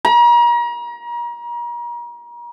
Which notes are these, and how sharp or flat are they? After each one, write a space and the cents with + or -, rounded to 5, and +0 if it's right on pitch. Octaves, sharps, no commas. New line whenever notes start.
A#5 +35